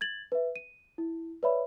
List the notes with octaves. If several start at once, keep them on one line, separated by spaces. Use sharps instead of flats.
G#6 A6 F#7
B4 E5
D#7
E4
B4 C#5 D5 E5 B5